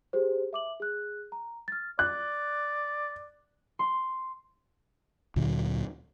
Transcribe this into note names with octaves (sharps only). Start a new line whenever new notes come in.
G4 G#4 C5
E5 D6 F#7
G#4 F#6
A#5
F6 A6
D5 F#6
C6
D2 A#2 D3 F#3